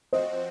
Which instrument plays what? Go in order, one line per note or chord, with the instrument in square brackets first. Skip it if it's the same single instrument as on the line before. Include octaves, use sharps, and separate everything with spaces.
[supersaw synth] F3 C4 F#4 [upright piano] C5 D#5